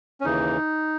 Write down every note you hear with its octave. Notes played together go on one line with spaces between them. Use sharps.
C#4
D#2 C#3 E3 D#4